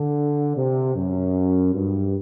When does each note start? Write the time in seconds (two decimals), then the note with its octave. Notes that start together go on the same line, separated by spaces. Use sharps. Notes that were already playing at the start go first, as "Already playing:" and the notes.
Already playing: D3
0.56 C3
0.95 F#2
1.74 G2